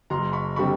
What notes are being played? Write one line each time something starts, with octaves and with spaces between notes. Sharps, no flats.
F#1 A#5 C6
B5 C#6
D3 G3 C4 B5 C#6